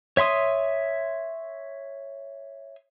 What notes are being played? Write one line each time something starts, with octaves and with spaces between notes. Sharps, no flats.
C#5 E5 C6 D#6